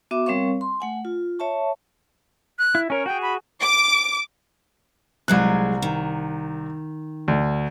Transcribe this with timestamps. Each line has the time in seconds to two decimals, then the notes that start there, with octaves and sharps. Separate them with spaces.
0.11 B3 F#4 E5 D6
0.26 G3 C4 A#4 C#5 F5 C#6
0.61 C6
0.80 A3 F#5 G#5
1.05 F4
1.39 C#5 E5 A5 C#6
2.59 F#6
2.75 E4
2.90 C#4 A#4 C#5
3.06 F#4 G#4 G5
3.22 B5
3.62 D6
5.28 C2 A#2 F#3 G#3 F#6
5.82 D#3
7.28 D2